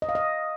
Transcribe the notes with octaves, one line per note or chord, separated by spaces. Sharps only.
D#5
F5
D#5